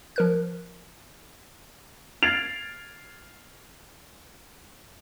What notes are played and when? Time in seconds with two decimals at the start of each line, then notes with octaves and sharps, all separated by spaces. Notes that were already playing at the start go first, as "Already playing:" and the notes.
0.16 F3 A#4 F#6
2.23 F6 G#6 A6 C7 D7 F7